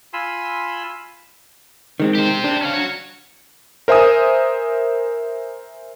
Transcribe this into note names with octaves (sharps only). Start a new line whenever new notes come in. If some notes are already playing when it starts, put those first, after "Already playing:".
F4 G#5 B5 C6 E6
D#3 G#3 C4
G4 C5
D4
C#4 F5
F#4 C#5
A#4 C5 E5 G#5 D#6